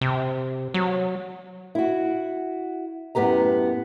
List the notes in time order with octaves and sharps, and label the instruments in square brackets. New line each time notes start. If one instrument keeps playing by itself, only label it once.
[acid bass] C3
F#3
[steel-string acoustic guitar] E4 F#4
F#2 A2 B3 G4 A#5